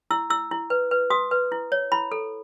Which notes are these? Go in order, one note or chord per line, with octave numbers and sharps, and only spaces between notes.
E4 E6
E4 E6
E4
B4
B4
F#4 D#6
B4
E4
C#5
E4 B5
A4